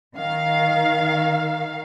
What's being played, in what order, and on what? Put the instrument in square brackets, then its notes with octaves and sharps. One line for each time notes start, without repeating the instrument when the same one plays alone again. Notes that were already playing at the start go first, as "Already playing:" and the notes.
[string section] D#3 F5